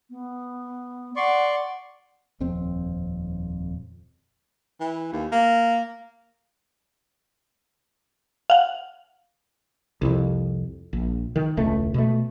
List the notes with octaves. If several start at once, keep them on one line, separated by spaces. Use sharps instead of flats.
B3
D5 F#5 C6 C#6
D#1 F2 C4
E3
D#2
A#3
F5 F#5
C2 F2
A#1
D#3
E1 C#2 A3
B2 A3